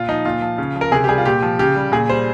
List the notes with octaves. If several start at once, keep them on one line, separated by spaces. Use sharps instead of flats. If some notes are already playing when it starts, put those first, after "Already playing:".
Already playing: A#2 F4
F3 D#4
A#2 F4
F3
C#3
F3
A#4
C3 G#4
G4
G3 G#4
F4
A#2 G4
F3
C#3 G4
G3
A#2 G#4
G3 C5